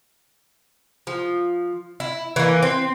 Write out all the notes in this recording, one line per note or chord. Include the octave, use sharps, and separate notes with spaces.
F3
E4
E3 A#3
C4